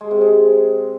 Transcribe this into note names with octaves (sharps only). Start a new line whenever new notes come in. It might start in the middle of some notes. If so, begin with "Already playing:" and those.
G#3
C3
G#3